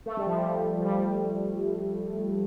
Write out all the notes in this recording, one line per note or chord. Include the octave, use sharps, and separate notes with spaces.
A3
G3
F3
G3
F3
G3